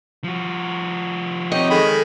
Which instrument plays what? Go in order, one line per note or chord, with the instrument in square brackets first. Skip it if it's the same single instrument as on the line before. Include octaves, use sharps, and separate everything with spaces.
[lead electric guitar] F3 F#4
[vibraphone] C4 C#5 C#6 [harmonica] D#4 G4 [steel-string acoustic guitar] D#5
[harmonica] D#3 G#3 B5 [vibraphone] G#4 A4 G5